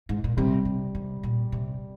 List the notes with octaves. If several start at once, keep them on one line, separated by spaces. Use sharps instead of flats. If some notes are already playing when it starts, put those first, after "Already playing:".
G#2
A#2
C3 G3
C3
C3
A#2
C3